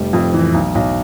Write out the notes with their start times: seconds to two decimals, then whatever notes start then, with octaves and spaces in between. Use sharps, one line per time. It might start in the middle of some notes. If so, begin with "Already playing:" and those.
Already playing: F1 G3
0.13 F2
0.33 E3
0.54 B1
0.75 B1